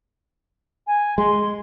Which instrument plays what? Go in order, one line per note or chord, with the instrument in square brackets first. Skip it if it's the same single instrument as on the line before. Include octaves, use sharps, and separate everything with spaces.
[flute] G#5
[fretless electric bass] G#3 [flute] C6